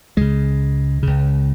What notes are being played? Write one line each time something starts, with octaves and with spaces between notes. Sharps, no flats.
C#2 C#3 G#3
C#2 C#3